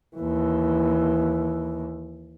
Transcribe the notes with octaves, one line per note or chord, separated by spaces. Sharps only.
D#2 E3